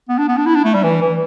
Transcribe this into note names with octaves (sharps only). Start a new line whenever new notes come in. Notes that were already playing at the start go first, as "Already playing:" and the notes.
B3
D4
B3
D4
E4
D4
A3
G3
E3
E3